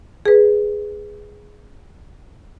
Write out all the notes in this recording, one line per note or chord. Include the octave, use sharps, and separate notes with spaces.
G#4 B4